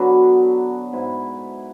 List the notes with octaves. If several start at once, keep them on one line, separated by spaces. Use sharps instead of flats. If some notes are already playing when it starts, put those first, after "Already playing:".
Already playing: D3 F#3 B3 D4 F#4 A4
G#2 G#3 B3 E4